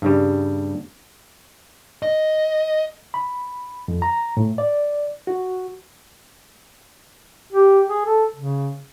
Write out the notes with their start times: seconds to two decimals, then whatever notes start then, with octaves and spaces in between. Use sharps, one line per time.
0.02 G2 C#3 G3
2.03 D#5
3.14 B5
3.88 F2
4.02 A#5
4.37 A2
4.58 D5
5.27 F#4
7.53 G4
7.88 G#4
8.05 A4
8.36 C#3